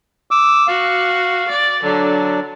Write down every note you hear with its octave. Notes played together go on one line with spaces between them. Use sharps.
D6 E6
F#4 F5
D5
D3 F#3 D4